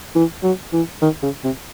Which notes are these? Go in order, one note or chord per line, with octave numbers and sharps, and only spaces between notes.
E3
F#3
E3
D#3
C#3
C3